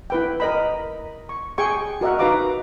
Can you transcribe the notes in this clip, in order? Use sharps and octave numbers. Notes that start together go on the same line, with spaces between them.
E4 B4 G5
A#4 D#5 B5
C#6
G#4 G5 G#5 C#6
F#4 A#4 D#5 E5 F#5
D#4 F#4 B4 F5 A#5 D6